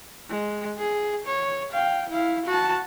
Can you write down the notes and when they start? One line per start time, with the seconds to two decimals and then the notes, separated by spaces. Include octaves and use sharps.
0.29 G#3
0.78 G#4
1.27 C#5
1.72 F5 G5
2.09 E4 F5
2.46 F#4 A5